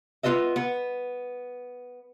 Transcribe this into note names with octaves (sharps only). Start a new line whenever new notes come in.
B3 F4 B4 D#5 E5
B3